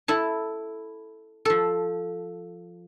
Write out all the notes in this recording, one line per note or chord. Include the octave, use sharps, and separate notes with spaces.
E4 A4 A5
F3 A4